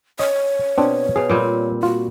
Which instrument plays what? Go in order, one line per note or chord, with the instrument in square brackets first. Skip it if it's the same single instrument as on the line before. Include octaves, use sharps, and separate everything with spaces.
[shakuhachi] C#5 [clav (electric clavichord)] D#5
[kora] B2 [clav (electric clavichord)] C4 D4
[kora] B2 F5 [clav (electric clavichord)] G#4
[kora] A#2 G3 C4
[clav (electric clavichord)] F4 [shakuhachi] F#4